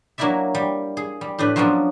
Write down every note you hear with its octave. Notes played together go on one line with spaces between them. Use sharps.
F#3 A#3 D4 E4 D5 E5
G3
G#4
G3
A2 D4 G4 B4
F3 F#3 B3 C#4 D4